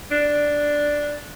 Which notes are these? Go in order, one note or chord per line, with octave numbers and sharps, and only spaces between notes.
D4